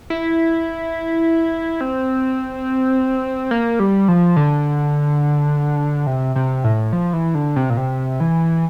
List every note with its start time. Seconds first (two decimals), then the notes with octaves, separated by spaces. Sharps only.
0.10 E4
1.81 C4
3.51 A#3
3.80 G3
4.08 F3
4.36 D3
6.07 C3
6.36 C3
6.64 A2
6.93 F3
7.13 E3
7.35 D3
7.56 C3
7.70 A#2
7.77 C3
8.20 E3